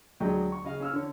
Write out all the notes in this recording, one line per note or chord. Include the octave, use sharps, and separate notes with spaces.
D2 F#3 G#3 D5 D#5 G5
C#6
C#3 D#5 F5
C#4 E6 F6
D3 C#5